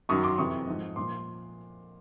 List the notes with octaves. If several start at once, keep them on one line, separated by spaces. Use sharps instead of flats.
F#2 D#3 F#3 C#6 D#6
C6 D6
F2 C3 E3 C#6 D#6
G#2 F3
A#2 F3 C6 D6